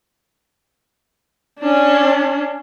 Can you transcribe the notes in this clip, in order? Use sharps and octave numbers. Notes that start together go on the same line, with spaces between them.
C#4 D4